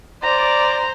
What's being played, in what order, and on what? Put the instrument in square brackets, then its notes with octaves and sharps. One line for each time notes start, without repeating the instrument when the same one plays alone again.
[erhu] C5 [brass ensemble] D5 [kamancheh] A#5